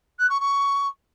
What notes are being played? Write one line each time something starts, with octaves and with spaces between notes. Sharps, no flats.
F#6
C#6
C#6